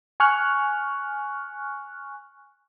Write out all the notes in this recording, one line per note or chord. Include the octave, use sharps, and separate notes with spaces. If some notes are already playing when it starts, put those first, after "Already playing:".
G#5 C#6 F6 F#6